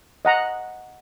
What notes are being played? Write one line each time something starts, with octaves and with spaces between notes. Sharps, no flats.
D#5 F#5 A#5